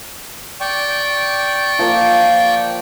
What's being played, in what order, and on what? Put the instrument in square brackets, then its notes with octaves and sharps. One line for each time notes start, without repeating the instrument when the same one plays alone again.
[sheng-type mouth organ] D5 G5 C#6
[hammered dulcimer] F3 A#3